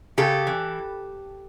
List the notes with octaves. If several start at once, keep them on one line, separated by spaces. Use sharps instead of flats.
C#3 G4 A4
E3